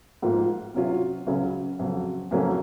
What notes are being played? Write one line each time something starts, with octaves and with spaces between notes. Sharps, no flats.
G#2 F3 A#3 F4
C3 F#3 C#4 F4
C#2 C#3 F#3 C#4
F2 C#3 F#3
F2 C#3 F#3 A#3 C#4